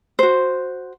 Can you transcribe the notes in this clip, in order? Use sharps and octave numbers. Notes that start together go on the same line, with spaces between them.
F#4 C5